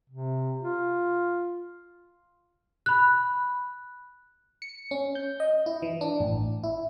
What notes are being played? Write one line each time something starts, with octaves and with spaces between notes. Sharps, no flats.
C3
F4
B5 F#6
C#7
C#4
G6
D#5
E4
E3
D4
A1
E4